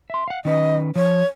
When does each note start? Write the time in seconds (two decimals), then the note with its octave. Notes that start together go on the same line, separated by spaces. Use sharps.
0.10 E5 C6
0.28 F5 F#5
0.45 D#3 C#4 B4 D#5
0.96 F3 C#5